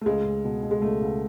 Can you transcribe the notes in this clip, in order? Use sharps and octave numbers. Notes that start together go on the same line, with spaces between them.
A3
C#2 G#3
C#2
B2
B2
G#3
C#2 A3
C#2